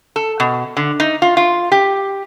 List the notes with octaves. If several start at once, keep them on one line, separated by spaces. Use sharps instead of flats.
A4
B2
D3
D#4
F4
F4
G4